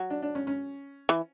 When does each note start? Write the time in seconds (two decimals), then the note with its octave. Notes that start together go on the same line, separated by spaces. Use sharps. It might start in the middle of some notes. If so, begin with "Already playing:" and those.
Already playing: F#3
0.10 D4
0.22 D4
0.35 C#4
0.47 C#4
1.09 E3